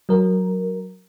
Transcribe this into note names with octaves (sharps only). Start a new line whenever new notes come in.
F#3 A#4